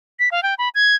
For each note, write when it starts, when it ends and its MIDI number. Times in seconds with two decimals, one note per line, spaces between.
0.19 0.29 95
0.32 0.43 77
0.43 0.54 79
0.58 0.69 83
0.75 0.96 92